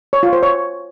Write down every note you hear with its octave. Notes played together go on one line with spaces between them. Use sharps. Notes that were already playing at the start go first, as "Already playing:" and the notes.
C#5
F4
C5
C#5